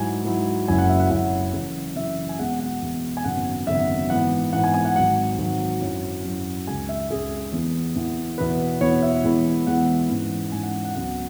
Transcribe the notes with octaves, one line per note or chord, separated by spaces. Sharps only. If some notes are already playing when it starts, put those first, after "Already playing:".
Already playing: G#2 F#3 E4 G#5
G#2 F#3 E4
F#1 F#2 F#3 C#4 E4 G#5
F#5
E5
F#5
F#1 F#2 F#3 C#4 E4 F#5
F#2 C#3 E3
F#2 C#3 E3 E5
G#5
E2 B2 G#3 F#5
F#5
E2 B2 G#3
G#5
G#1 F#2 C#3 F#3 B3 F#5
G#1 F#2 C#3 F#3 B3 E5
G#2 E3 B3 F#5
G#2 E3 B3 F#5
G#5
G#5
F#5
G#1 G#2 F#3 F#5
G#1 G#2 F#3
F#2 F#3 C#4 E4
F#2 F#3 C#4 E4
C#2 C#3 G#3 G#5
E5
C#2 C#3 G#3 G#4
E2 E3 B3
E2 E3 B3
E2 B2 B3 E4 B4
E2 B2 B3 E4 C#5
E5
E2 E3 G#3 B3 E4
E2 E3 G#3 B3 E4 F#5
G#2 E3 C#4
G#2 E3 C#4 G#5
F#5
F#5
C#2 C#3 F#3 B3 F#5